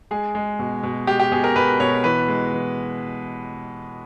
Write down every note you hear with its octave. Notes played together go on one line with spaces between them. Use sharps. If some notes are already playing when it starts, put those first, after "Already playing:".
G#3 G#4
G#3
B2
B2
G#3 G4
G4
B2 G#4
A#4
B2 B4
B2 C#5
E3 B4
G#3
E3